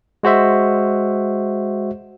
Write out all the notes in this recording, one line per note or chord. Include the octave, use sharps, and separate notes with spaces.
G#3 F#4 C5 E5